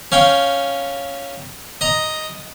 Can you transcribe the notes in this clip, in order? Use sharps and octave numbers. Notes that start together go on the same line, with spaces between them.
C#4 F5 G5
D#5 A#5